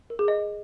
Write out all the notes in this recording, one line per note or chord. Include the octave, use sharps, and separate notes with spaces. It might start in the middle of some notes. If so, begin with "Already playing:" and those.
A#4
G#4
D#5